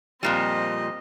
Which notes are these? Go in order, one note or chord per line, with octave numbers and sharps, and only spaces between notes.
F2 A#2 G3 C4 D#5